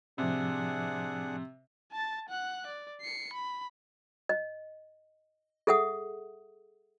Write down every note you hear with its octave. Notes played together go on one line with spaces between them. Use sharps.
A2 C3 F3 D4 G#4 F#5
A5 A6
F#5 F#6
D5
C7 C#7
B5
D#5
G#4 A4 E5 F#5 D#6